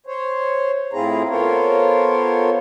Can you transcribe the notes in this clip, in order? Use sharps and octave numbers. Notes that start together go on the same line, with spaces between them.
C5 C#5
A2 C4 E4 F4 G#4 A#5
B3 F4 A4 A#4 C5 C#5